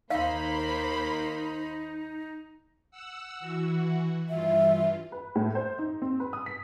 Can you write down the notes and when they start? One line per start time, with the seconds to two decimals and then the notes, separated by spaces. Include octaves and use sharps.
0.10 D#2 A#3 D#4 C5 F5 B5
2.91 F#5 E6
3.40 E3 F#4
4.29 G2 E3 F4 E5
5.12 B4
5.35 A2
5.55 C5
5.79 D#4
6.02 C4
6.20 B4
6.33 D#6
6.46 B6